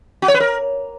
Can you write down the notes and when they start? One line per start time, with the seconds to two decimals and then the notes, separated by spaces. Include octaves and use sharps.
0.22 F#4
0.28 C#5
0.34 B4
0.40 A#4